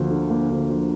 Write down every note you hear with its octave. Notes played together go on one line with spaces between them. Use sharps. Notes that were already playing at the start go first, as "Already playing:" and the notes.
Already playing: D2 D3 F3 A#3
D3
A#3
D2
F3